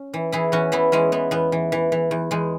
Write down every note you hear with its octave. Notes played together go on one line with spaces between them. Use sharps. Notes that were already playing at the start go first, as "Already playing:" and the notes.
Already playing: C#4
E3
E3 E4 G#4
E2 C#4 F#4
E3 B3 E4
E3 G#3 C#4
E3 B3
E2 B3
E3
E3
E3
E2
E2 G#3